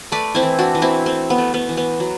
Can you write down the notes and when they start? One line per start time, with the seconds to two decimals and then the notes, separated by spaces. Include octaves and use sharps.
0.12 A3 B4 D5
0.35 C4 E4
0.43 E3
0.59 D4 F#4
0.75 E3
0.82 C4 E4
1.06 A3 C4
1.30 B3
1.38 A3
1.54 B3
1.69 E3
1.77 B3
2.00 F#3